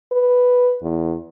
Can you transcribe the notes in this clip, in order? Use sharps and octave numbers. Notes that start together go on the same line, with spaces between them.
B4
E2